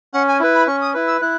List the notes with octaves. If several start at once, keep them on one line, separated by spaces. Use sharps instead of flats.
C#4 F#5
G#5
E4 B4
B5
C#4 C#6
D#6
E4 B4
E6
E4 F#6